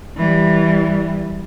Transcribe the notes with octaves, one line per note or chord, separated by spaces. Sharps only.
E3 G3